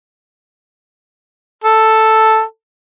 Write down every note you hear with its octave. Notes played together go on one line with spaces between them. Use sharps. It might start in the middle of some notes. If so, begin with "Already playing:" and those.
A4